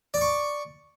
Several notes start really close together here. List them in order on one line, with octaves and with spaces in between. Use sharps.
D5 D6 C#6